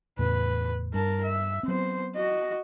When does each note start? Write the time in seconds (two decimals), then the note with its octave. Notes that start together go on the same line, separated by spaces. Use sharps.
0.19 E2 A2 C#3 B4
0.94 G2 A#4 A5
1.24 E5
1.63 F#3 B3 C4 C5
2.15 F#4 D#5